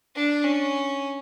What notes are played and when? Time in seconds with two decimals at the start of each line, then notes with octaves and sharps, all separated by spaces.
0.16 D4
0.44 C#4